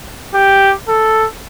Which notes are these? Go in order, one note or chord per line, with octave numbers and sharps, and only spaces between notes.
G4
A4